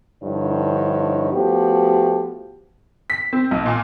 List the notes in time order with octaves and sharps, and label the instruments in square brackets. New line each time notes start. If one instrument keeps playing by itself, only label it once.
[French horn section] G2 D3 F3 D#4 E4 C#5
F3 A3 B3 F#4 G4
[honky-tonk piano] B6
C4
B1
A#2